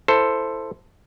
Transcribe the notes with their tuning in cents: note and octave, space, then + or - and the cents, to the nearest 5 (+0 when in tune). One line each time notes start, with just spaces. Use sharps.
E4 +5 A4 +10 C5 +0